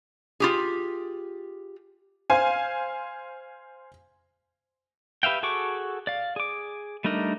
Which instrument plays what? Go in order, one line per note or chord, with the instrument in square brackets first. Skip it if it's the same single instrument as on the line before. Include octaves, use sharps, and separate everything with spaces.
[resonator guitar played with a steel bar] F4 G4 G#4
[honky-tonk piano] C5 F5 G#5
[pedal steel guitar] G4 B4 E5 F5 G5
F#4 G#4 A4 C#6 D6
D5 F5
G#4 D6
G3 A3 D4 D#4 A#4